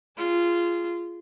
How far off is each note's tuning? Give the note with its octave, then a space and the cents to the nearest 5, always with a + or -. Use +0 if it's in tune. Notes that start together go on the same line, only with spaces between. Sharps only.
F4 -15 G#4 +0